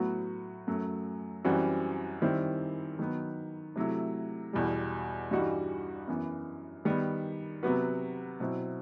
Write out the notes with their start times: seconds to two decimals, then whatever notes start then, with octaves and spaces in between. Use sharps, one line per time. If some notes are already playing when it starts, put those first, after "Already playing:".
Already playing: A2 F#3 B3 F#4
0.67 F#2 F#3 A3
1.45 F#2 E3 G3 C4 F#4
2.22 D#3 G3 C4 E4
2.99 D#3 F#3 B3
3.76 C3 F#3 A3 E4
4.53 E2 B2 G3
5.31 G2 E3 G3 D#4 F#4
6.08 F#2 E3 B3
6.85 D#3 G3 B3
7.63 C3 F#3 B3 F#4 B4
8.40 B2 F#3 C4 E4